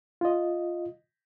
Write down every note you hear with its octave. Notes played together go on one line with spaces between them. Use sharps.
F4 D#5